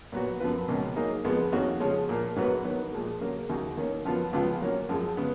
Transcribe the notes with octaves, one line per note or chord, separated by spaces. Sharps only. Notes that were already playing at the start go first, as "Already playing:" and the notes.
A#2 F#3 B3 F#4
F#2 F3 B3 F4 B4
C#2 B2 F#3 A#3 C#4
F#3 A#3 D#4 G#4
F2 F3 G#3 B3
F2 D#3 A#3 C#4 F#4
C#3 F3 G#3 C#4
A#2 F3 A#3
G#2 F#3 B3 F#4 B4
D#3 F#3 B3
A#2 F3 G#3
C#3 F#3 A#3
D#2 C#3 G#3 D#4 F#4
D#3 A#3 C#4
F#2 F3 B3 F4
C#2 C#3 F3 B3 F4
F#3 A#3 C#4
F#2 F3 G#3
C#3 G#3 B3